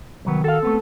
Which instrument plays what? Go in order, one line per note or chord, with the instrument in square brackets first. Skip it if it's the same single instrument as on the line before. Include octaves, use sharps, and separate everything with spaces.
[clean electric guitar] C2 F#3 B3 [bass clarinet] D#3
[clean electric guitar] F#4 F5 [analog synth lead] A4
[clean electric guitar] A3 B3 C4